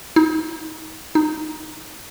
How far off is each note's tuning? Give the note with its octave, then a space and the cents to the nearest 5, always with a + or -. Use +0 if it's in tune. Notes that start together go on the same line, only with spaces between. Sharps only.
D#4 +20
D#4 -15